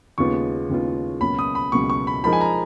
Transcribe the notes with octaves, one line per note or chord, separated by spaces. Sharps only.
D#2 C#3 G#3 B3 F4 C#6
D#2 C#3 G#3 B3 F4
C#2 B2 F#3 A#3 C#4 B5
D#6
B5
C#2 B2 F#3 A#3 C#4 C#6
C#6
B5
F3 G#3 D#4 A#4 B5
G#5
A#5